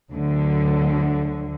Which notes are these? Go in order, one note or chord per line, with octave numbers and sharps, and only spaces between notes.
D2 D3 F#3